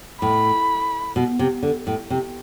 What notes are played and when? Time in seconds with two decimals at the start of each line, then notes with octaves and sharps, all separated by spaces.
0.22 A2 B5
1.16 B2
1.39 C3
1.63 D3
1.87 A2
2.10 C3